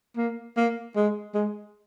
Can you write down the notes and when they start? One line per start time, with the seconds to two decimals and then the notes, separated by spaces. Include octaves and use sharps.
0.17 A#3
0.57 A#3
0.96 G#3
1.35 G#3